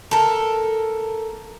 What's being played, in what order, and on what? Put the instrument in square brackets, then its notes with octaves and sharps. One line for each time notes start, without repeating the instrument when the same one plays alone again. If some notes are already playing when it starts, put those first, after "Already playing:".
[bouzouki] A4 A#4